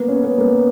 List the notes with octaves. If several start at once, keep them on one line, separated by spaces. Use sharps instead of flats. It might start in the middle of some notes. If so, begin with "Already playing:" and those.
Already playing: A#3 B3
C#4
B3
A#3